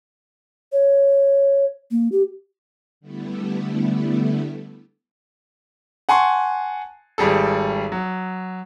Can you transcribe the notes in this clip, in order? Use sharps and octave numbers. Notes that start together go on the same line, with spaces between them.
C#5
A#3
G4
D3 G3 A3 B3 E4
F#5 G#5 A5 C6 C#6
G#1 G3 G#4 A4
F#3